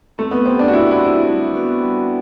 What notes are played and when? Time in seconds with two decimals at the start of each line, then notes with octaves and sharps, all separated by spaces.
0.18 A3 C4
0.31 B3
0.45 C4 C5
0.48 G4
0.59 D4
0.68 F#4
0.73 C4 E4
0.91 E4
1.00 G4 C5
1.28 G3
1.55 B3 D4 F#4 B4
1.83 G3